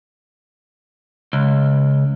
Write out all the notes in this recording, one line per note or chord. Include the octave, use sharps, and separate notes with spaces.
C#2